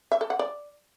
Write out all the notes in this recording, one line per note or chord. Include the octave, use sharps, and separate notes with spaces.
E5
A4
F#5
D5